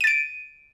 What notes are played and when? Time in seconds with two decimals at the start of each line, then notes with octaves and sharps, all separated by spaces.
0.01 D#7
0.04 A6
0.07 D7